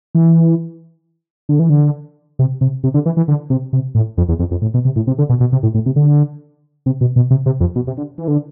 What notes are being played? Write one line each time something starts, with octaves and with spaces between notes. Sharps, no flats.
E3
D3
E3
D3
C3
C3
C3
D3
E3
E3
D3
C3
C3
A2
F2
E2
F2
F2
A2
B2
C3
A2
C3
D3
B2
B2
C3
A2
A2
C3
D3
C3
B2
B2
C3
C3
F2
B2
C3
D3
E3
D3